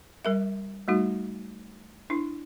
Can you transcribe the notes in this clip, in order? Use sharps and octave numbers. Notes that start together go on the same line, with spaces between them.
G3 A#4 E5
G3 A3 D#4 F#4
D4 E4